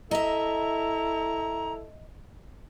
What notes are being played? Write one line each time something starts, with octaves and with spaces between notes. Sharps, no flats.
E4 A4 D#5 E5 A#5